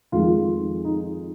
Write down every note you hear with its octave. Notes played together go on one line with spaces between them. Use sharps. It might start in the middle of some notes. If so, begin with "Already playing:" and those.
F2 D#3 G#3 F4
D#4